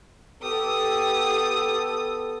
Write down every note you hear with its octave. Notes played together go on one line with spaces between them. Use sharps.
B3 G4 A4 D#6